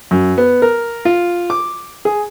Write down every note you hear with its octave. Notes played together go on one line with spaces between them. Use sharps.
F#2
B3
A#4
F4
D6
G#4